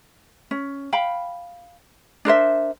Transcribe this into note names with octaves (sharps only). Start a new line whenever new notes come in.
C#4
F5 G5 B5
D4 A#4 C5 E5